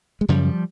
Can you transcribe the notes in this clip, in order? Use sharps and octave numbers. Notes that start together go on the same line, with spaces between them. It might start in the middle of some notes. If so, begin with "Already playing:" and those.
G#3
F#2 C#3 F3 G3